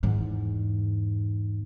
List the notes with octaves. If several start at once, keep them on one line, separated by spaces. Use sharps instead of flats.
E2 G#2